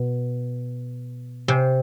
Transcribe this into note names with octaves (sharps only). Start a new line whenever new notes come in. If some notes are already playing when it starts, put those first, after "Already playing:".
Already playing: B2
C3